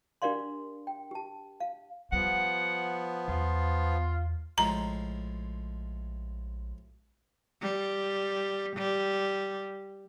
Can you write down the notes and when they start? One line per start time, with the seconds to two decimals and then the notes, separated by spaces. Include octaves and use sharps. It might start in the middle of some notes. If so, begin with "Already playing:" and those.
0.22 D4 G4 A#4 D5 F5 C6
0.87 G5
1.11 G4 A5
1.60 F5
2.12 F3 G3 B3 F#5
3.28 E2 F4
4.58 A#1 A2 F3 G#3 A#5
7.62 G3
8.77 G3